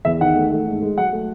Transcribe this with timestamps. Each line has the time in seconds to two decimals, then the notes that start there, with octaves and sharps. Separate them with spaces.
0.05 E2 E5
0.21 D#3 F#5
0.36 A3
0.52 A3
0.67 G#2
0.82 G#3
0.98 F#3 F#5
1.12 A3